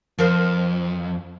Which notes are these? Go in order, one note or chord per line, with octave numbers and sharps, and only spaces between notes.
F2 F3 A#4 C5